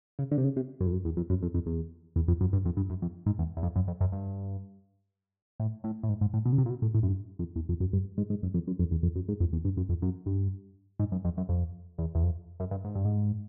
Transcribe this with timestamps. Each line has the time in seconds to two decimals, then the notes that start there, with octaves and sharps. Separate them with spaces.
0.19 C#3
0.31 D3
0.38 C3
0.44 C#3
0.56 C3
0.81 F#2
0.87 F2
0.92 F#2
1.05 E2
1.17 F2
1.30 F#2
1.43 F2
1.54 F2
1.66 E2
2.16 E2
2.28 F2
2.41 F#2
2.53 G2
2.65 F2
2.77 G2
2.90 F#2
3.02 F2
3.26 G#2
3.39 E2
3.57 E2
3.63 F2
3.76 F#2
3.87 F2
4.01 F#2
4.12 G2
5.60 A2
5.84 A2
6.03 A2
6.09 G#2
6.21 G#2
6.34 A2
6.45 B2
6.52 C#3
6.58 C3
6.66 A#2
6.70 B2
6.82 A2
6.94 A2
7.03 F#2
7.08 G2
7.39 F2
7.56 E2
7.69 F2
7.80 F#2
7.93 G2
8.18 G#2
8.30 G#2
8.43 F#2
8.54 F2
8.67 F#2
8.79 F2
8.91 E2
9.03 F2
9.16 F#2
9.28 G#2
9.40 F2
9.53 E2
9.65 G2
9.77 F#2
9.89 F2
10.02 F#2
10.26 G2
10.99 G#2
11.12 F#2
11.25 F2
11.37 F#2
11.49 F2
11.98 E2
12.15 E2
12.23 F2
12.60 F#2
12.71 G2
12.84 G#2
12.95 G2
13.05 G#2